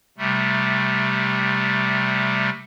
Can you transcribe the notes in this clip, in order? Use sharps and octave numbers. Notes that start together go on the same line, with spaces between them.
C3 G3 A3